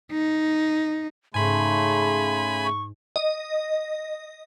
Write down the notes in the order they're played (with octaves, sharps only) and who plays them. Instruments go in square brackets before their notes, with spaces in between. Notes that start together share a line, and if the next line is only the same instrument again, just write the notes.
[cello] D#4
[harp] G#2 [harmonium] C#3 A3 [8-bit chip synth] G#5 B5 [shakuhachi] C6
[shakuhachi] C#6
[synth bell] D#5